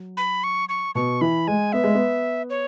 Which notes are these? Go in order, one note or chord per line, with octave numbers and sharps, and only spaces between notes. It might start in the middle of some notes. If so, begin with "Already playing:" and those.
Already playing: F#3
B5
C#6
C#6
B2 C#6
E3 B5
G#3 G#5
B3 E5
G#3
B3
C#5